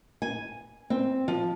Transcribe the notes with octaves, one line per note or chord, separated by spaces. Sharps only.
G#5
C4
F3